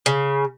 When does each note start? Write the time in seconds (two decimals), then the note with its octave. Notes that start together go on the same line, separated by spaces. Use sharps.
0.06 C#3